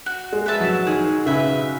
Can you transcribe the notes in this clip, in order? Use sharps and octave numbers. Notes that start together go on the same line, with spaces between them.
F#4
G#3
B4 E5 A5
F#3
D#3 G#4
C#3 B4 E5